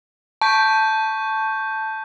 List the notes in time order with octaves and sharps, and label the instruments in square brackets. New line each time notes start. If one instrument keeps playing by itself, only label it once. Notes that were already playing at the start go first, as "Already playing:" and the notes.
[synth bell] A5 [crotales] C#6 G6 B6